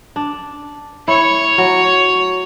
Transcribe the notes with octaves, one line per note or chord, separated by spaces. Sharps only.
D4
E4 C#5
F#3